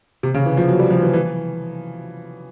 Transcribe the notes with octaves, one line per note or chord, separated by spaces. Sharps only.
C3
C#3
E3
F3
F#3
G3
F3
E3
E3